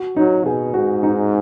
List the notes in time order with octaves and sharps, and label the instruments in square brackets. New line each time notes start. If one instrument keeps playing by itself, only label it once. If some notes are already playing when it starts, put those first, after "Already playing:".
Already playing: [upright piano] F#4
[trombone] F#3 [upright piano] D#4
[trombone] B2 [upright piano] G#4
[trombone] G#2 [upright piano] F#4
[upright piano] D#4